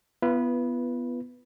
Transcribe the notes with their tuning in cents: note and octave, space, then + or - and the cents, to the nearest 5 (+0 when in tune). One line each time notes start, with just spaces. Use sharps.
B3 +0 F4 -45 B4 -10